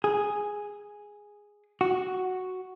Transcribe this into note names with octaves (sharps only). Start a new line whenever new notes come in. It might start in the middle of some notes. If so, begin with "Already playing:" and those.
G#4
F#4